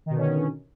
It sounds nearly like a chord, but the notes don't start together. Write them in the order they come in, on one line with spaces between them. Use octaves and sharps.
D#3 B2 D3 C#4